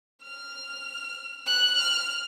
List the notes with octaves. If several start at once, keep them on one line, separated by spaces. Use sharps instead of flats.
F6
F#6
F6